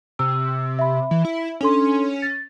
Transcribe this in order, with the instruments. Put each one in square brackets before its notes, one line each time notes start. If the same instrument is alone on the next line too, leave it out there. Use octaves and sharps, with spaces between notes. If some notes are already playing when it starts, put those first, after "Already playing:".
[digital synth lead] C3 [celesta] E6
[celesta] E5 B5
[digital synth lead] E3
E4
[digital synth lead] C#4 [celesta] D4 A4 C6
[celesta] A6